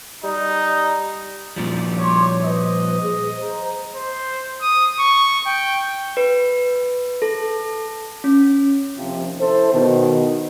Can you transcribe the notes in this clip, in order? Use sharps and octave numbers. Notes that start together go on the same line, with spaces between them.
G3 D#4
A#2 F3 G3
C#5 C6 D6
B4 C5 D#5
G#4
C5 A#5
C5
D#6
C#6
G5
B4
A4
C#4
D#2 C3 F3
E4 A4 C5
B2 D#3